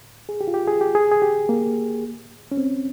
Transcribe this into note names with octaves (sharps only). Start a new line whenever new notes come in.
G#4
G4
F4
G4
G#4
G4
G#4
G#4
G4
A#3
C#4
C4